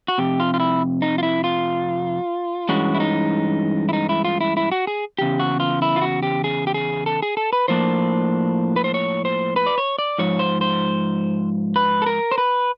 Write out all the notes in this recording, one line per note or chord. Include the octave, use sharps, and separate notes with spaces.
F#4
F2 C3 G4
F4
F4
E4
D#4
F4
E4
F4
G2 E3 G#3 C#4 F#4
E4
D#4
E4
D#4
E4
F4
E4
E4
F#4
G#4
E2 C#3 G4
F#4
F4
E4
F4
F#4
G4
G#4
G4
G#4
A4
G#4
A4
B4
A2 F3 A#3 D4 C5
B4
C5
C#5
C5
B4
D5
C#5
D5
G#2 F3 C#5
C5
C5
B4
A4
A#4
C5
B4